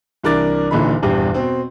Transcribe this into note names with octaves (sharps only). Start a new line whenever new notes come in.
C2 E3 D4 A#4 D6 A6
D#1 A#2 D3 E3 D#4 B5
D#1 E2 G2 G4
B2 C4